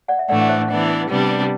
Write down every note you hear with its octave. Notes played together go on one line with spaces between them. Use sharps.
D5 F#5
E5
A2 E3 A3 D4 D5 F#5
F#5
C5 E5
E3 B3 D4
C3 G3 B3 D4